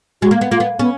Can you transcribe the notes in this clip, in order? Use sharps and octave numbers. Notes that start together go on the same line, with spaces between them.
G#3 F#4
A#3
B3
A#3 F4
B3
B3 C#4